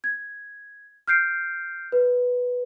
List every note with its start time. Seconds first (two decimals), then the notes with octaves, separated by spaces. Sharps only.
0.04 G#6
1.07 F6 G6 C7 D7
1.92 B4